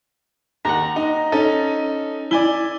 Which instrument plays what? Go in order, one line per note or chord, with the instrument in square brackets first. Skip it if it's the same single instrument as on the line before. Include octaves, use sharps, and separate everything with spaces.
[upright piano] D#2 [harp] F#5 A#5
[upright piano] D#4
[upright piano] C#4 D#4 A4 [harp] A6
[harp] E4 [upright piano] D5 G#5 G7